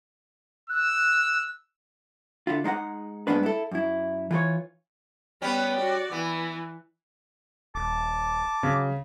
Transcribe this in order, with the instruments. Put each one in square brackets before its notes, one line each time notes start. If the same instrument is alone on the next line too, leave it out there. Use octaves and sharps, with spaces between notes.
[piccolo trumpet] E6 [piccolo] F#6
[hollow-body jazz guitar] D3 E4 F4
G#3 D#4 B4 F#5
G2 G#3 A#3 B3 D4 B4
E4 A4
F#2 E4
E3 F4 A4 C#5
[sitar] G3 C#4 [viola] B3 B4
[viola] F#4 D5
[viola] E3 [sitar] B3
[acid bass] D#1 [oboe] A5 [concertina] D6
[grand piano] C#3 [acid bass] F#3